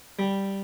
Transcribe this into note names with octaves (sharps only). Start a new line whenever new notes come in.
G3